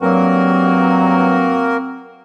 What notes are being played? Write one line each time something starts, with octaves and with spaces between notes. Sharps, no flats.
G2 F#3 A#3 C4 F#4 A#4